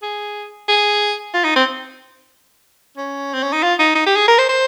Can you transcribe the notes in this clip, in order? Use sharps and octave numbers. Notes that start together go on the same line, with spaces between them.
G#4
G#4
F4
D#4
C4
C#4
C4
C#4
D#4
F4
D#4
D#4
G4
G#4
A#4
C5
C5